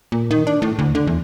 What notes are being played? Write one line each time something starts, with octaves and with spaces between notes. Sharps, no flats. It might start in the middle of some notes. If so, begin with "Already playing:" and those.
A#2
D#3
D4
A2
D2
D3
E2